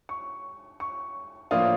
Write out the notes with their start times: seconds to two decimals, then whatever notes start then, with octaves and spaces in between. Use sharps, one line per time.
0.09 C#6
0.80 C#6
1.51 A2 F3 A#3 D4 F4 D#6